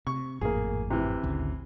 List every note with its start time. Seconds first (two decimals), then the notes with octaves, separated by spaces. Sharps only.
0.07 C3 C#6
0.41 G#1 F2 A2 A#3 G#4
0.90 C3 E3
1.23 G#1 D2 C#3